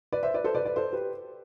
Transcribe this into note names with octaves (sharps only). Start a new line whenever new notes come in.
B4 D5
C5 E5
B4 D5
A4 C5
B4 D5
B4 D5
A4 C5
G4 B4